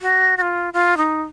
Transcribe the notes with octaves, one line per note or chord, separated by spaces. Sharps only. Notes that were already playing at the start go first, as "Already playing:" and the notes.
F#4
F#4
F4
F4
D#4